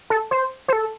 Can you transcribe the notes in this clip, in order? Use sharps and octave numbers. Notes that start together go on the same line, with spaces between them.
A4
C5
C5
A4